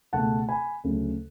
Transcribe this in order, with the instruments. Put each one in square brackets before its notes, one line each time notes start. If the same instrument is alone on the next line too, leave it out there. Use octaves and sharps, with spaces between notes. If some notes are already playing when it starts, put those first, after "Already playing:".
[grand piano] C#2 B2 A3 F#5 A5
G#5 B5
D2 C#3 F#3 C#4